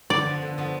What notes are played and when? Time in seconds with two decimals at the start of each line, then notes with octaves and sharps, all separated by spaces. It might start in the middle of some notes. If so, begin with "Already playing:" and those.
0.10 D3 D5
0.26 F3 B3
0.42 D3
0.58 F3 B3